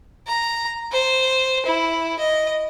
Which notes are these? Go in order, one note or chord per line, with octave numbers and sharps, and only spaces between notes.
A#5
C5
E4
D#5